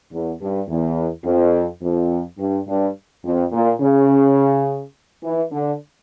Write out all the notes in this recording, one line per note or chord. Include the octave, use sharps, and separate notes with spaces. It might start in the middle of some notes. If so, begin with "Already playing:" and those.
E2
G2
E2
F2
F2
G2
G2
F2
A#2
C#3
E3
D3